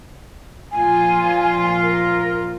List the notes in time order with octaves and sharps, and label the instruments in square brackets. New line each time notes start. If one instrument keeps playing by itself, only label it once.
[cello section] A#2 F3 F4 [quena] G#5
[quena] A#4